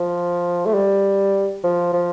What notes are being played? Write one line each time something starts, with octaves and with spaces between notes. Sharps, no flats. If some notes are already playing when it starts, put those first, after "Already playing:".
Already playing: F3
A3
G3
F3
F3